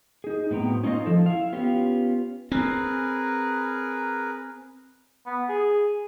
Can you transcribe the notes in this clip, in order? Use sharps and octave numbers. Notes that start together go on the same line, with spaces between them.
D#4 G#4
A2 F#3 B3 C4 G5 A#5
C#4 D#4 F4 C5 D#5
F3 A4
E4 F5
B3 C#4 F4 G4
C4 G#4 A#4 B4
B3
G#4